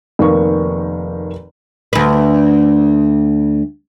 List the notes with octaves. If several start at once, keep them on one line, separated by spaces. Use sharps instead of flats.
F1 D#3 A#3 C#6
D2 B4